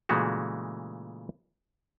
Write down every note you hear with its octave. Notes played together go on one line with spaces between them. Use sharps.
A#2 C#3 E3 G#3 A3 F#4